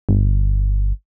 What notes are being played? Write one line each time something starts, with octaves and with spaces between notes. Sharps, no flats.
G1